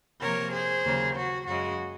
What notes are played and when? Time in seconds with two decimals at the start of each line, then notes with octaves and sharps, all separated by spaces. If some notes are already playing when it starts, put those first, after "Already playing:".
0.21 C3 F3 A#3 A#4 C#5
0.53 G#4 C5
0.84 D#2 C#3 F#3 A#3
1.15 F#4
1.46 F#2 C#3 G#3 F#4